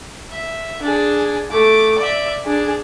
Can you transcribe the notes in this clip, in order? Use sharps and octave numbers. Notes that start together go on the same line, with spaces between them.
E5
D4 G#4
A3 D6
D5 E5
D4 G#4